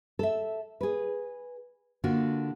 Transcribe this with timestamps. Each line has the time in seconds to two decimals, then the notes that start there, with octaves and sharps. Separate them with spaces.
0.19 A4 E5
0.81 G#4 B4
2.04 D3 A#3 F4 F#4